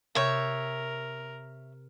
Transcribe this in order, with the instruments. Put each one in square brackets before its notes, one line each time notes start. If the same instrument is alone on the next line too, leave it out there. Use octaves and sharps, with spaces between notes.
[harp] C3 G6 D#7 [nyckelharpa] A#4 [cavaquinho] C#5 E5